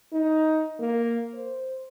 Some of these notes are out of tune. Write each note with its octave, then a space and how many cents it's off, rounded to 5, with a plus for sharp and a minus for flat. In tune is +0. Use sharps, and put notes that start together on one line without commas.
D#4 +15
A#3 +0
C5 +0